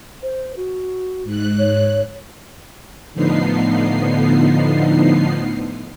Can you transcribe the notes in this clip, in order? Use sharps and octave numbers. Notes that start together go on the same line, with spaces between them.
C5
F#4
G#2 F#6
C#5
A2 D3 F3 B3 D#4 C7